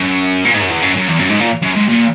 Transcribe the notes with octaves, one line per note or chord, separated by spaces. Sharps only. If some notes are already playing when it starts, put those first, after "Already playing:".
Already playing: F#2
A#2
G#2
F#2
E2
F#2
F#2
E2
F#2
G#2
A#2
F#2
G#2
A#2